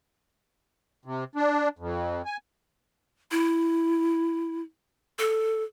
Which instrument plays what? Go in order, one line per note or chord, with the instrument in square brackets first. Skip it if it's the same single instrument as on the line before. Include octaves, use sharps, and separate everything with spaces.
[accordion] C3
D4
F2
G#5
[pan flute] E4
A4